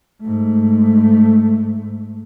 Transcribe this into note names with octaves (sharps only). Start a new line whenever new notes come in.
G#2 A3